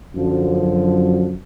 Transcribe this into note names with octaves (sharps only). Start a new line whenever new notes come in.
F#2 D3 F3